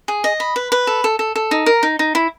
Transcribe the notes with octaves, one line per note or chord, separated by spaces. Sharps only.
G#4
D#5
B5
B4
B4
A4
A4
A4
A4
D#4
A#4
D#4
D#4
E4